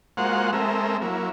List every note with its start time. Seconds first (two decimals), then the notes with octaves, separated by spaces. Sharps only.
0.17 G#3 A#3 F4 F#4 C5 F#5
0.53 G#3 A3 C4 A#4 E5
1.01 F#3 A#3 E4